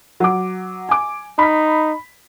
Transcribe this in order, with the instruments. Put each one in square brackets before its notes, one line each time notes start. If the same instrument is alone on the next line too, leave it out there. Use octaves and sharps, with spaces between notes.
[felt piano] F#3 D6
G#5 D6
[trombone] D#4 [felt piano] B5 B6